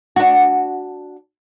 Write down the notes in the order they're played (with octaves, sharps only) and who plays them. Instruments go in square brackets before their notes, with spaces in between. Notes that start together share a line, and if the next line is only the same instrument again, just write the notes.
[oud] D4 F#4